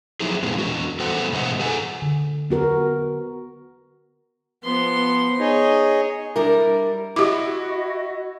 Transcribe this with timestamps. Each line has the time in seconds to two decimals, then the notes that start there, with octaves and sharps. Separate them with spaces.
0.20 F3 F#3 D#4 E4 G#4
0.43 A#2 F3 G#3 B3
0.58 E2 F#4
0.99 E2 G3 B3 A4 C5 F#5
1.32 G#2 B2 E3 A4 D#5 F#5
1.60 G#4 A4 F#5 G#5
2.02 D3
2.50 B3 F#4 A#4
4.64 F3 B3 C6
5.40 D#4 G#4 C#5 D#5
6.36 G3 D4 E4 A#4
7.16 E4 F#4 G4 D#5 D6